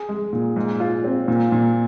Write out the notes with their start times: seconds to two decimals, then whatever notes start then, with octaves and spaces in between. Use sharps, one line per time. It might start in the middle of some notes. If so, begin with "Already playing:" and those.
Already playing: G#4
0.09 G#3
0.33 A#2
0.56 G#2
0.80 F4
1.04 C4
1.28 A#2
1.52 A#2